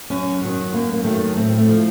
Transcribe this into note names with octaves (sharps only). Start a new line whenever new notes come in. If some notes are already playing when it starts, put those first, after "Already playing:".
F#2 C#4
D#3 F#3
F#2 A#3
A#3
D#3 F#3 A3
A2 C4
A3
F3